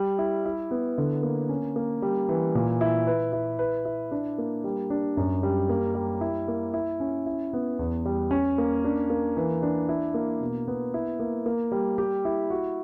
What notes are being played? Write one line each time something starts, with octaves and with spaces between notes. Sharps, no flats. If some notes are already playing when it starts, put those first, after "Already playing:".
Already playing: G3
E4
E4
B3
D3
A#3
C#4
A#3
G3
E3
A#2
E4
B4
E4
B4
E4
D4
A#3
G3
D4
F#2
G3
A#3
G3
E4
A#3
E4
C#4
E4
B3
E2
G3
C#4
A#3
D4
A#3
E3
D4
E4
A#3
B2
B3
E4
A#3
A#3
G3
G4
E4
F#4